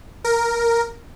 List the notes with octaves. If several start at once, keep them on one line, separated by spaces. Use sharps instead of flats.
A#4